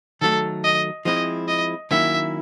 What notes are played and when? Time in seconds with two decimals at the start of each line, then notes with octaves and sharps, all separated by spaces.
0.21 D#3 F#3 A3 A4
0.64 D#5
1.05 F3 G#3 C4 E4 D#5
1.48 D#5
1.91 D#3 F#3 A#3 C#4 E4 E5